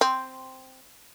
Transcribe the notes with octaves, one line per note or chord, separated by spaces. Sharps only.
C4